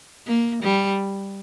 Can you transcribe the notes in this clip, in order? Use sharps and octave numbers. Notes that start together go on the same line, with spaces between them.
A#3
G3